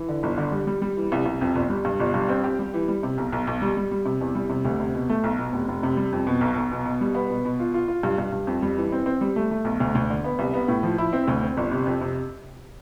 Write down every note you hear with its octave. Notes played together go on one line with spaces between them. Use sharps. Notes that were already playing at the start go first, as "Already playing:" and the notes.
Already playing: E3
D3
G1
D3
G3
G3
G3
E3
C2
C2
F2
G1
G3
G2
G1
G2
C4
G4
G3
E3
G3
C3
B1
B1
B1
G3
G3
G3
C3
E2
G3
C3
D2
C3
B2
A3
B1
B2
F1
F1
C3
G3
F2
B2
B1
B1
B2
B2
G3
B3
B2
B2
F4
F4
F4
G2
G2
G2
F2
G3
E3
C4
C4
G3
A3
A3
B1
D2
D2
D3
B3
C2
B3
A2
F3
E4
C4
D2
C4
G1
C3
F2
C3